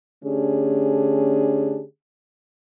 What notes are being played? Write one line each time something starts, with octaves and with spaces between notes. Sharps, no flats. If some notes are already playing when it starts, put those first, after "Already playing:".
D3 A3 C#4 D4 G4 G#4